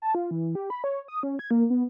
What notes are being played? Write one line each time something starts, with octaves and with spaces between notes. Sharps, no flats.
A5
F4
E3
G4
B5
C#5
D#6
C#4
G#6
A#3
B3